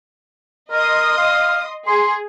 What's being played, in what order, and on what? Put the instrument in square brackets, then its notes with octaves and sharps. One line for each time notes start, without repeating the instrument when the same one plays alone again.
[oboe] A#4 [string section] D#5 C6 D#6
[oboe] F5
[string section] G#4 [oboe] C6